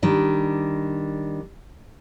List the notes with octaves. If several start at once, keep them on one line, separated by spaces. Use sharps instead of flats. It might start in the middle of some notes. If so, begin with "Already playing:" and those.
D#3 G3 D4